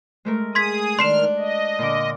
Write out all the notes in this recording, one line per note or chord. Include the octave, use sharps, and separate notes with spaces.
G#3 A3 A#4
G#4 C6 D#6 G#6 B6
D#3 D4 C6 F6 C7 E7
D#5
A#2 D3 D6